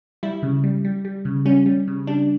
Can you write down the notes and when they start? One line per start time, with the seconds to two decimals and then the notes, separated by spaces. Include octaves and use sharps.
0.23 G3 E4
0.43 C#3
0.64 G3
0.85 G3
1.05 G3
1.25 C#3
1.45 G3 C#4
1.66 G3
1.88 C#3
2.07 G3 D4